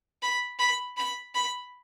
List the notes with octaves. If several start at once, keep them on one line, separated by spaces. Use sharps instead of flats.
B5
B5
B5
B5